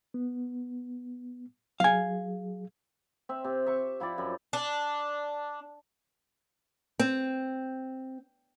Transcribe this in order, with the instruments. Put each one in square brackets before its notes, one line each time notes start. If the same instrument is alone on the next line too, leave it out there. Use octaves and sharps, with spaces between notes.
[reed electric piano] B3
[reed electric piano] F#3 G#4 [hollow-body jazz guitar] F5 G#5
[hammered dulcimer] C4 E5
C3
E5 C#6
F3 E4 G4 D5
F#2
[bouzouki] D4
[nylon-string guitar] C4